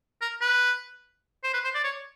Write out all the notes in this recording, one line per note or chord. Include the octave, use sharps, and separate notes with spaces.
A#4
B4
C5
B4
C5
D5
C#5